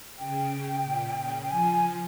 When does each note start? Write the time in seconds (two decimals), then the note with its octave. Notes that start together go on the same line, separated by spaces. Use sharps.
0.18 C#3 G5
0.84 A#2
1.17 C#3
1.43 G5
1.51 F3 G#5
1.73 G#5